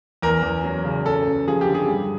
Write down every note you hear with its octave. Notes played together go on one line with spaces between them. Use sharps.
E2 A#4
E2
F#3
C#3
F#2 A4
F#2
F3 G#4
G4
D3
G#4
G2